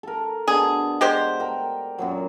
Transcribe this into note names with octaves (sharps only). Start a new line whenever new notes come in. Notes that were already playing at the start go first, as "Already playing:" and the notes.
A4 A#4
B2 D4 G#4 G#5
G#3 G4 C5
A#4 G5
F#2 A#2 F#3